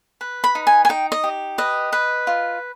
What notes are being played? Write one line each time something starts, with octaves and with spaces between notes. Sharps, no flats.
B4
B5
D#4
G#5
G#5
D#4 G5
D#5
G4
B4 D#5
B4
F4